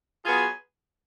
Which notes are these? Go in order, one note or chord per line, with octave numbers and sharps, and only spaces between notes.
F#3 B3 F4 G#4